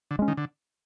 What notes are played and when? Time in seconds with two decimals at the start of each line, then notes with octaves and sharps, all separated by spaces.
0.11 D3
0.19 G#3 C#4
0.28 D#3
0.37 D3